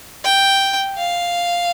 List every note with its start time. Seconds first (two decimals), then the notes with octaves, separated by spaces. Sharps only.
0.24 G5
0.98 F5